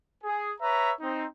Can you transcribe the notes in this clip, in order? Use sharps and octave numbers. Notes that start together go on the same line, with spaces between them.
G#4
B4 C#5 E5 A#5
C4 D#4